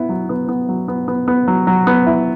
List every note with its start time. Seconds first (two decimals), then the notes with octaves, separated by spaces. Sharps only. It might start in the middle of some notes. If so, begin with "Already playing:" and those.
Already playing: B3 E4
0.09 F#3
0.29 B3
0.48 B3
0.69 F#3
0.88 B3
1.08 B3
1.28 B3
1.48 F#3
1.67 F#3
1.87 B3
2.06 E4